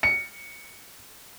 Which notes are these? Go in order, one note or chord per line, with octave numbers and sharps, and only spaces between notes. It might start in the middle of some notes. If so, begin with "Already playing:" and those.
C#7